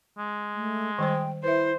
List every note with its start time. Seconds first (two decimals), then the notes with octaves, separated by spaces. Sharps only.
0.18 G#3
0.54 A3
0.98 D#3 G3 C5 G5
1.44 E4 B4 C5 E5